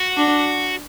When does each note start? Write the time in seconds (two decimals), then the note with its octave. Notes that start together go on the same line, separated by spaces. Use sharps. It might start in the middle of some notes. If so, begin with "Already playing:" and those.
Already playing: F#4
0.17 D4